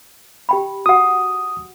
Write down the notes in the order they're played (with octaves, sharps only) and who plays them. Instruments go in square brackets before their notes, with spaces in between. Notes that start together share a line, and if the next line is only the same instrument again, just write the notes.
[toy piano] G4 G5 B5
[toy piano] F#4 F#5 [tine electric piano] D#6